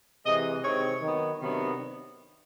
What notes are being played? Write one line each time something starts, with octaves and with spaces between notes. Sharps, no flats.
C3 E3 G#3 D#5
C3 D#3 G#3 C4 C#5
D#3 F#3 B3
C3 D#3 F#3 B3 D4